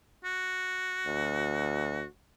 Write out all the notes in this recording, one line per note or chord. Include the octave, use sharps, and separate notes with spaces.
F#4
D2